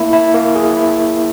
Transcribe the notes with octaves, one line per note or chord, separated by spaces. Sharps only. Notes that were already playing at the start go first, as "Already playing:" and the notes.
Already playing: A#3 E4
E4
A#3
G#4
E4